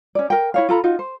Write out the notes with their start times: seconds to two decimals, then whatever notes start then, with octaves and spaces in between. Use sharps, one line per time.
0.15 C#4 D5
0.30 A#4 G5
0.54 E4 C#5 F5
0.69 F4 A4 A#5 B5
0.84 D#4 F4 F#4
0.99 C5